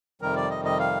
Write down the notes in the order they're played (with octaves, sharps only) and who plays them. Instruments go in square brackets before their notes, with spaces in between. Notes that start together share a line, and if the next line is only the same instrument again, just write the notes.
[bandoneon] F2 C3 D#3 G3 A#4
D5
D#5
D#5
F5